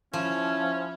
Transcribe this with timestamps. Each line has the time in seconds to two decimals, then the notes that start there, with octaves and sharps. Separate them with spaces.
0.13 F3 C#4 E4